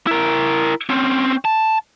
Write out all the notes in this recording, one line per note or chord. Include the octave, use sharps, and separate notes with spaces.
E4 A#4
C4 C#4
A5